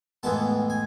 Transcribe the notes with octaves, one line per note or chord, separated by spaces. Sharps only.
A2 E3 G#3 B3 A5
G#5